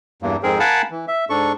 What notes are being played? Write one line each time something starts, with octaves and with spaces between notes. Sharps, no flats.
E2 G2 A#3
F2 G#2 C4 G#4 A#4
A#4 F5 F#5 G#5 A5 B5
E3
E5
G#2 D4 A4 C#6